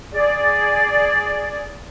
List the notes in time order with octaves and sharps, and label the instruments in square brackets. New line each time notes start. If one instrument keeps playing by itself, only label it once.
[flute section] G#4 D5